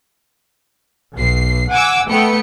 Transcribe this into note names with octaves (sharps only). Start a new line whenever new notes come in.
B1 C7
F#5 G#5 D6 E6
A3 B3 G5 C#7